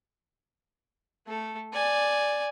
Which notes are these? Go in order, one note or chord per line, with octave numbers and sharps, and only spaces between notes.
A3 A4
D5 G#5